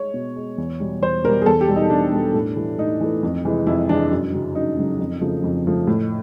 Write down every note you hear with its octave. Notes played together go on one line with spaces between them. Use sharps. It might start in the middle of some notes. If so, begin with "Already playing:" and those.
Already playing: G#3 C#5
B2
G#3
E2
B2 G3
E2 C5
B2 G3 A#4
G#4
E2 A4
G4
B2 G3
D#4
E2 D4
B2 G3
A2
E3 A3
A2 D#4
E3 A3
F2
C3 E3 G#3
F2 E4
C3 E3 G#3 D4
F#2
C#3 F#3
F#2 D#4
C#3 F#3
F2
C#3 F3 A3
F2
C#3 F3 A3
A2